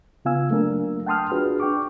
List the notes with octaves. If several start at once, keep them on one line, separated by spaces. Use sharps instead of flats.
C#3 B3 F4 F5 G#5 E6
F#3 A3 A#3 D4 A#4
F#5 G5 A5 C6 D#6 F6
D4 F4 F#4 G#4 B4
D4 G5 C#6 D6